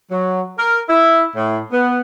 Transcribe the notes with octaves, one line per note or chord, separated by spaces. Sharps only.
F#3
A#4
E4
A2
B3